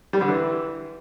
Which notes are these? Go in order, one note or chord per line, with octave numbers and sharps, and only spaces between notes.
G3
D3
E3